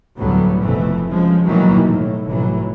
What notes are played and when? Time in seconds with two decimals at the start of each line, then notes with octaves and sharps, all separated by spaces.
0.18 D2 A2 D3 F#3 G3 B3
0.61 F1 F2 B2 E3 A3
1.09 C#3 F3 G#3
1.45 B2 D#3 E3 F#3 G3 A#3
1.87 A2
2.27 F1 A2 E3 F#3